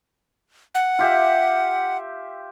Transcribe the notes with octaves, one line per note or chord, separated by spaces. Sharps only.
F#5
F4 G4 E5